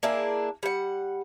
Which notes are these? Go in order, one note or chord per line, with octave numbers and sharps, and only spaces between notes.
A#3 D4 E4 G#4
G3 F#5